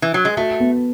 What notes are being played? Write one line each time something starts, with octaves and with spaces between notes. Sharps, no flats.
E3
F#3
G#3
A3 F#4
B3